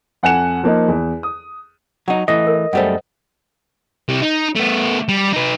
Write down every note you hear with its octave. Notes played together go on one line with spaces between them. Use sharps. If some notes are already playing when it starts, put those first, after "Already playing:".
F2 F#5 G#5 F#6 C#7 E7
F3 A#3 D#4
E2
D#6
F#3 D#4 F#5
E3 A3 D#5
A#4
F#2 G3 A3 C5 F#5
C3 G3
D#4
A3 B3
G3
D#4 B4